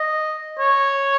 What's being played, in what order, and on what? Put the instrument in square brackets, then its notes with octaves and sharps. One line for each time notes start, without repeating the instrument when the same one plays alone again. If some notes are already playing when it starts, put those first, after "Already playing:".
Already playing: [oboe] D#5
C#5